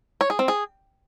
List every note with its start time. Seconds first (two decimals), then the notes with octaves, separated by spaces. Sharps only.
0.21 C#5
0.30 G#4
0.39 C4
0.48 G#4